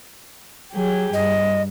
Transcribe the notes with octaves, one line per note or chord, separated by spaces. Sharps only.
F#3 G4 G#4
G2 D#5